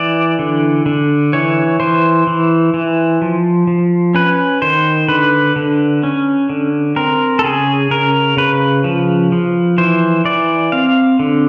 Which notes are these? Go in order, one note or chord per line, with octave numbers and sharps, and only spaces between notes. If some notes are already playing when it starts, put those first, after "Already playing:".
Already playing: E3 D5
D3
D3
E3 C#5
E3 C5
E3
E3
F3
F3
C#4 B4
D#3 C5
D3 B4
D3
C#4
D3
C4 A#4
A4
C#3 G#4
C#3 A#4
C#3 B4
F3
F3
E3 C5
E3 D5
C4 F5
D3